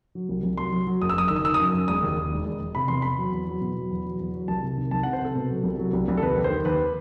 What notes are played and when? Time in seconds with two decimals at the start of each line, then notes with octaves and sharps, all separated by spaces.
0.15 F#3
0.29 C2
0.43 C2
0.57 F#3 C6
0.73 F#3
0.87 F#3
1.02 F#1 D#6
1.09 E6
1.15 F#1 D#6
1.28 D#3 E6
1.36 D#6
1.44 D#3 E6
1.54 D#6
1.60 F#2
1.74 F#2
1.88 E1 D#6
2.03 D#2
2.17 D#2
2.32 E1
2.45 E1
2.61 E1
2.75 C3 B5
2.88 E2 C6
3.02 E2 B5
3.18 F#3
3.32 E2
3.48 F#3
3.61 B2
3.77 F#3
3.91 E2
4.05 F#3
4.20 E2
4.34 F#3
4.48 C2 A5
4.63 C3
4.77 D#3
4.91 C2 A5
5.03 F#5
5.07 C3
5.13 C5
5.21 C3 A4
5.35 B2
5.50 F#3
5.64 C2
5.79 F#3
5.93 C2
6.08 C2
6.17 A4
6.22 D#2 B4
6.37 D#2
6.44 C5
6.51 D#3
6.65 D#2 B4